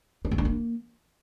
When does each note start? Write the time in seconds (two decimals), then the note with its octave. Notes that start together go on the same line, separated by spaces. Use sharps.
0.25 D4
0.31 A3
0.38 D4
0.45 A#3